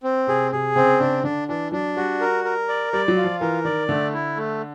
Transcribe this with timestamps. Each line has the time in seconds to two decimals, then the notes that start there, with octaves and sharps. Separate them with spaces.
0.03 C4
0.27 C3 G#4
0.51 C3 G#4
0.76 C#3 C4
1.00 C#3 D4
1.24 D3 D4
1.48 E3 D4
1.72 F#3 D4
1.97 G3 F#4
2.21 A#4
2.44 A#4
2.68 D5
2.93 G3 D5
3.08 F#3
3.17 F4
3.24 F3
3.40 E3 A#4
3.65 D#3 D5
3.89 D3 A3
4.13 E4
4.37 A3